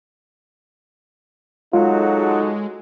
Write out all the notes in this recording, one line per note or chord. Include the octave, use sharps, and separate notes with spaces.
F#3 G#3 D#4 F4 F#4 A4